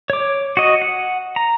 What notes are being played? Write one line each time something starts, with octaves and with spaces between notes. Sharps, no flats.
C#5 D6
F#4 D#5
F#5
A#5